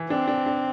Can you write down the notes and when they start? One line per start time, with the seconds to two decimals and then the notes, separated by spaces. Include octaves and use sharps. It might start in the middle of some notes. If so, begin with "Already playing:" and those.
Already playing: E3
0.10 C4 D4
0.28 D4
0.46 D4